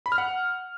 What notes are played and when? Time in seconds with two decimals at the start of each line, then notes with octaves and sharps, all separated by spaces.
0.06 B5
0.12 F6
0.18 F#5